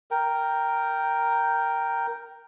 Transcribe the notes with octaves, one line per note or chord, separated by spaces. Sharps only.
A#4 G5